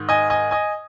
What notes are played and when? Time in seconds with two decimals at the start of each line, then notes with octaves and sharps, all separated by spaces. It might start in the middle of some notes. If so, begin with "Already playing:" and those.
Already playing: G#2 D#3
0.09 D#5 G#5
0.30 D#5 G#5
0.51 D#5 G#5